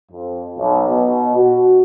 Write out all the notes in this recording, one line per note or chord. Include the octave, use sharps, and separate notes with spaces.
F2
B1
B2
F#4